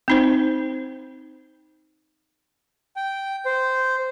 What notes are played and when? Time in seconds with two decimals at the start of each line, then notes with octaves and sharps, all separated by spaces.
0.08 C4 D#4 C5
2.96 G5
3.45 C5